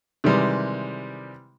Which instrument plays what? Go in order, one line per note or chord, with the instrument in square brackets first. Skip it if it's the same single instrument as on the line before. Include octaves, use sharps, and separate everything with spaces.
[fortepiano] C3 D#3 E3 G3 G#3